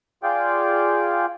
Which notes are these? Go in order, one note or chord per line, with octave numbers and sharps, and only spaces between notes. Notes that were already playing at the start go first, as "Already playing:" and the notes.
F4 G#4 D5 F5 G5